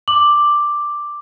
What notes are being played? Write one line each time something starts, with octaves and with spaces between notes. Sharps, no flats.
D6 F#7